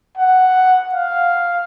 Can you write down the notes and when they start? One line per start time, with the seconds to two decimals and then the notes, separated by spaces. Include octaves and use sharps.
0.18 F#5
0.95 F5